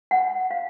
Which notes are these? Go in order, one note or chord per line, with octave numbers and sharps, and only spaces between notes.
F#5
F5